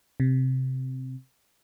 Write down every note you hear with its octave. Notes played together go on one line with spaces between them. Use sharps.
C3